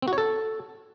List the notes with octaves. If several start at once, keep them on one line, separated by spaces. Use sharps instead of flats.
C4
F#4
C#5
A4